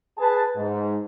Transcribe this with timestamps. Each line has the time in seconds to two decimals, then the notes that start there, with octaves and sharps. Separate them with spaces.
0.17 G#4 B4 A5
0.56 G#2